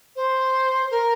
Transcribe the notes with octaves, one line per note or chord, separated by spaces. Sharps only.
C5
A#4